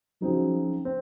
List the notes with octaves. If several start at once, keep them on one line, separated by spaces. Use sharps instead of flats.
C#3 F3 F#3 C4 D#4
C4